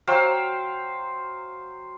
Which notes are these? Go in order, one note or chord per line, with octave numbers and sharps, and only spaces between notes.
F#3 C5 F5 G5